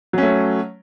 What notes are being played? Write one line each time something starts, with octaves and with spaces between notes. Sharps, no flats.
F#3 A3 C#4